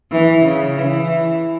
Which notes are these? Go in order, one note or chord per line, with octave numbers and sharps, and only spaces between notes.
E3
C#3
E3